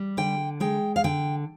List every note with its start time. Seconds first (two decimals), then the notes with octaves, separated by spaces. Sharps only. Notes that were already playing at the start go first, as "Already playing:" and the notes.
Already playing: G3
0.17 D3 G5
0.60 G#3 G5
0.96 F5
1.04 D3 G5